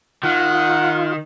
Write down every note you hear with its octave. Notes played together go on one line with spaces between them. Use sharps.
D#3 F4 F#5